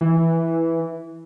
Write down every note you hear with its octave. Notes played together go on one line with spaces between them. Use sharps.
E3